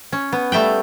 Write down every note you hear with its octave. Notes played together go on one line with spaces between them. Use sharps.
C#4
B3
G3 A3 E5 G5